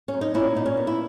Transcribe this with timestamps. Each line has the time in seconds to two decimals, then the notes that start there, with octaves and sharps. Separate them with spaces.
0.08 C#4
0.13 F#2
0.21 D#4
0.34 A#2 C#4 E4
0.55 A#2 D#4
0.66 C#4
0.77 B3
0.87 E4